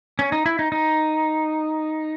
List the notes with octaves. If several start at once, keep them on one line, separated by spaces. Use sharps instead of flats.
C#4
D#4
E4
D#4
D#4